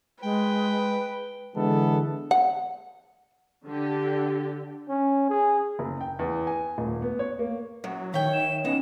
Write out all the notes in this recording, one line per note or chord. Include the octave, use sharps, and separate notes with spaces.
G#3 B4 G5
D3 E3 G#3 B3 A4
F#5
D3 G4
C#4
G#4
F#1
G5
E2
G#5
D#1
B3
C#5
A#3
F#2 F#3
D#3 C#5 E5 G5 C#6
E7
B3 C#4 D#4 E7